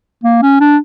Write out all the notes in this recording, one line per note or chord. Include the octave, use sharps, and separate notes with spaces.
A#3
C#4
D4